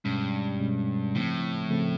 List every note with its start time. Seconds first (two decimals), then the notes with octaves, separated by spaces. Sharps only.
0.05 G2 B2 G#3 C#4
0.60 B2 G#3 C#4
1.15 A2 C#3 F3 A3 C4
1.70 C#3 F3 A3 C4